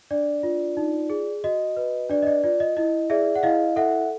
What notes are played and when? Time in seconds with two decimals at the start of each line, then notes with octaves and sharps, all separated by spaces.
0.11 D4 D5
0.43 F4
0.77 D#4
1.10 G#4
1.44 F#4 D#5
1.77 B4
2.09 D4 D5
2.22 D#5
2.27 D5
2.44 F4 D5
2.60 D#5
2.77 E4 D#5
3.10 G#4 D5 E5
3.36 F#5
3.43 E4 D#5 F5
3.76 A4 E5 F#5